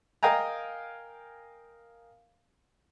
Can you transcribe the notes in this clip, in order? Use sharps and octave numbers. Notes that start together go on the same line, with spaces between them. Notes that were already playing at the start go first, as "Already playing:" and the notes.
A#4 D#5 F5 G5 G#5 A#5